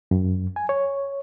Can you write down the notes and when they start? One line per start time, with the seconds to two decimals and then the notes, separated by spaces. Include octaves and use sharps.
0.11 F#2
0.56 G#5
0.69 C#5